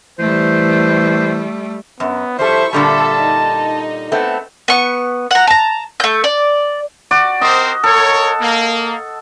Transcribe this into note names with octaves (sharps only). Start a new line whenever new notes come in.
E3 G3 A3 C5
F#2 B3
F3 G3 E4 A4 C5 E5 C#6
A#2 D3 G3 A4 E5 A5
D#4
A3 B3 C4
B3 C#6
F#5 A#5
A5 A#5
A3 G6
D5
F#4 D5
C4 A#4 C5 D#5
A4 A#4 C#5
A#3